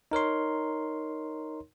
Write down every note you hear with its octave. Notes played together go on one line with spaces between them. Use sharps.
D#4 A#4 C#5 C6